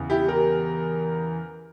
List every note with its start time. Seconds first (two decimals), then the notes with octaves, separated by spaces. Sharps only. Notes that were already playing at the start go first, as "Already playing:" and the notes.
Already playing: E2 C#3
0.10 E4 G4
0.28 G4 A#4